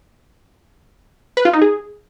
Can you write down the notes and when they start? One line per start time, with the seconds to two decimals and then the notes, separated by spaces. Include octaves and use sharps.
1.37 B4
1.45 F4
1.53 D#4
1.62 G#4